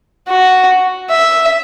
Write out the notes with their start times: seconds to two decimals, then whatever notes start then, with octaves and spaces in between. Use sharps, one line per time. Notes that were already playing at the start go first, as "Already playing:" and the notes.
0.28 F#4
1.10 E5